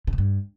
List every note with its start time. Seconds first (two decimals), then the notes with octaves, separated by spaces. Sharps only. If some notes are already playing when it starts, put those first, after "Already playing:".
0.07 B2
0.13 C3
0.18 G2